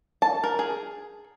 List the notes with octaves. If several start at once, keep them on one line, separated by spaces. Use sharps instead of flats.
A5
A#4
G#4